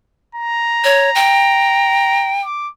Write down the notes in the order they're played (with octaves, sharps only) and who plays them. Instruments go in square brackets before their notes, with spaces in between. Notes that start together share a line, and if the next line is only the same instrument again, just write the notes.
[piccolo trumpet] A#5
[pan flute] C#5
G5
[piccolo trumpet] D6